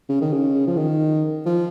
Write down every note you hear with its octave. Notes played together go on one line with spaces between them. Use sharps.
C#3
D#3
C#3
F3
D#3
F3